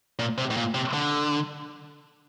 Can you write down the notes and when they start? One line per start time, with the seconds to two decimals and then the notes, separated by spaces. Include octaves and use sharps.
0.19 A#2
0.38 C3
0.51 A2
0.57 A#2
0.74 C3
0.94 D3